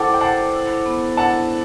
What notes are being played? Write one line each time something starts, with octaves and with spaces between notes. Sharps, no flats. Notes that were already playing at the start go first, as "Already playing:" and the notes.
Already playing: E4 A4 C5 F#5 G5 A5 D6
G5
C5 F#5 A5
E4
B3
E4 F#5 A5